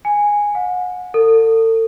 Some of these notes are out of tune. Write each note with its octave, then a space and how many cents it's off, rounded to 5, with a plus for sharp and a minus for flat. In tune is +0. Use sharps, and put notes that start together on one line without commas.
G#5 -10
F#5 -30
A4 +40